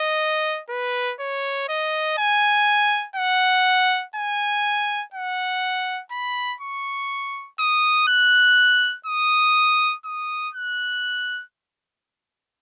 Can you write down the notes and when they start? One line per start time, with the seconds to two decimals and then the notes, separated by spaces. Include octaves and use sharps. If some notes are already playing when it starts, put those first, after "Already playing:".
Already playing: D#5
0.70 B4
1.20 C#5
1.69 D#5
2.18 G#5
3.16 F#5
4.15 G#5
5.14 F#5
6.11 B5
6.60 C#6
7.59 D#6
8.08 F#6
9.06 D#6
10.05 D#6
10.54 F#6